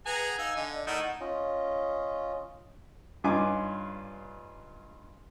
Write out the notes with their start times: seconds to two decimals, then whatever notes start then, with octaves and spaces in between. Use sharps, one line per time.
0.06 G#4 B4 F#5 G#5 A#5
0.38 D#4 F5 E6
0.56 D3 D#5
0.75 D5
0.87 A3 D#4 E4 A#4 F#5
1.20 C#4 F4 D#5
3.24 G2 C#4 D#4 F4 G#5 D6